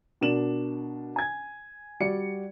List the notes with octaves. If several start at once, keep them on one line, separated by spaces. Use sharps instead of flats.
B2 D4 A#4 E7 F#7
G#5 G#6
G3 F#4 D5 C#7